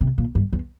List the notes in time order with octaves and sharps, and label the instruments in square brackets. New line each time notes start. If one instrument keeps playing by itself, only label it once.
[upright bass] C3
A#2
G2
E2